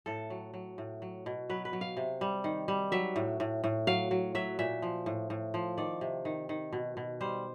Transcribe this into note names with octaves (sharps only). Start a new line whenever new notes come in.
A2 A4
F#3
F#3
A2
F#3
B2
F#3 B4
B4
F#3
F5
C3
G3
D#3
G3
F#3 E5
A2
A2
A2
F#3 F5
F#3
F#3 E5
A#2 E5
F3
A2
A2
F3
D#3 D5
C3
D#3
D#3
B2
B2
G3 C5